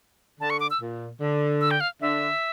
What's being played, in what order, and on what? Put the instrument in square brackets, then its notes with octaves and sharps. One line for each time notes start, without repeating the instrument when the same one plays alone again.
[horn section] D3 [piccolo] A5
[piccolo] C#6
D6
E6
[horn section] A#2
D3
[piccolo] E6
G5
F5
[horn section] D3 [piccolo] E5